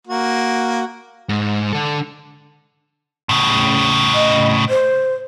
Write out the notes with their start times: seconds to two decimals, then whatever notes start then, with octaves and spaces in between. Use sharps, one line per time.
0.07 A#3 F#4
1.29 G#2
1.73 D3 A4
3.29 A2 C#3
4.14 D#5
4.70 C5